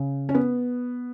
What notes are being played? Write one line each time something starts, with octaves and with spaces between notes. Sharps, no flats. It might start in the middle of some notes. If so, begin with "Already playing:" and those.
Already playing: C#3
C#4
B3